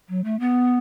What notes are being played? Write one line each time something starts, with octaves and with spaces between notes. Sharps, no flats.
F#3
A3
B3